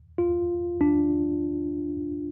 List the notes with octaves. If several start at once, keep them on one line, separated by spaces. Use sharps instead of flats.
F4
D4